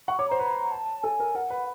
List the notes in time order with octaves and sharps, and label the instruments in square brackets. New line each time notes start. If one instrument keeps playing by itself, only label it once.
[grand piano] F#5 [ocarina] C#6
[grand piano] C#5 [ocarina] D6
[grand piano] C5 [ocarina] A#5
[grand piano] B4
[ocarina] A5
[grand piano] A4 [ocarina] G#5
[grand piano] A#4
[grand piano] A#4 [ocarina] F#5
[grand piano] B4